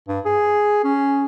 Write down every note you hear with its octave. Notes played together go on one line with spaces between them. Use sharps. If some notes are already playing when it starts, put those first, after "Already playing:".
G2
G#4
C#4